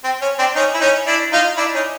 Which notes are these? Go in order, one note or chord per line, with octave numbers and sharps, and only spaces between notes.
C4
C#4
C4 D4
C#4 D#4
E4
C#4 D#4
D4 E4
D#4 F4
D4 E4
C#4 D#4